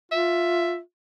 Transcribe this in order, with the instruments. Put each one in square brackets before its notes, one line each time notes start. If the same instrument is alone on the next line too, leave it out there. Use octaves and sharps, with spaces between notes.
[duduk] F4 [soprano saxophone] E5